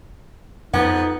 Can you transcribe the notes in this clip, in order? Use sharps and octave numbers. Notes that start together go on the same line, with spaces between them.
F2 B3 D#4 F#5